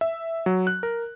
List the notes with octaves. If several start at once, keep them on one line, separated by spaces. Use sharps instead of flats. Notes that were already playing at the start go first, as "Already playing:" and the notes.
E5
F#3
F#6
A#4